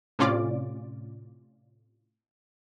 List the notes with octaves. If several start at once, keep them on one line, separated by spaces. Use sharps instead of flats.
A2 C3 C#4 F4 D5 D6